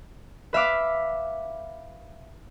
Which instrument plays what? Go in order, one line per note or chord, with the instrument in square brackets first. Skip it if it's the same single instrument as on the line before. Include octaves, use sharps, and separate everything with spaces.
[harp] B4 E5 F5 D6